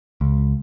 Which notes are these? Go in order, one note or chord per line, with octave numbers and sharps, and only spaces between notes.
C#2